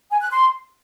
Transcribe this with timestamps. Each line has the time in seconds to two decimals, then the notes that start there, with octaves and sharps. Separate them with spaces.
0.11 G#5
0.21 F#6
0.31 C6